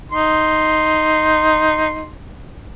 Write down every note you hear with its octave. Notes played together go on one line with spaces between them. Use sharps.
D#4 C6